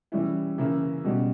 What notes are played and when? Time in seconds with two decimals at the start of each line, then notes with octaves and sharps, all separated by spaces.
0.12 E3 G3 C#4 E4
0.58 C#3 E3 A#3 C#4 E4
1.05 B2 G3 C#4